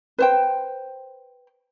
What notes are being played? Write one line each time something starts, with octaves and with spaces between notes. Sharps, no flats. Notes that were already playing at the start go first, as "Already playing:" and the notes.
B4 C5 G5